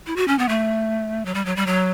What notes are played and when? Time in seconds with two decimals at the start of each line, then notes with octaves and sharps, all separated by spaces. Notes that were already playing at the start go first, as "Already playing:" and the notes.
0.06 E4
0.16 F#4
0.28 C#4
0.39 B3
0.49 A3
1.25 F#3
1.34 G3
1.45 F#3
1.56 G3
1.67 F#3